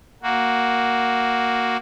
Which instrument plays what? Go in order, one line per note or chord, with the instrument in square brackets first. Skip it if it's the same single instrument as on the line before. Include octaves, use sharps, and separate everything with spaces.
[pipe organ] A#3 F#4